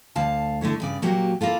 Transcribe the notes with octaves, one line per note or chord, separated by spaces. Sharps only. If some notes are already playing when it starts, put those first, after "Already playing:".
D2 F5 A5
D3 A3 E4 C#5
G2 C#3 D5
A#2 F#3 A#3 F#4 G4
A#3 E4 F4 A4